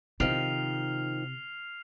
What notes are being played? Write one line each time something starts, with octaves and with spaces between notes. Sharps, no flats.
C3 D#3 F3 F6 C7 F7